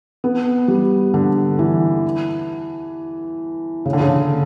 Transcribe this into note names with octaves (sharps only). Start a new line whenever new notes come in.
B3
G3
D3
E3
C#3
D3
C#3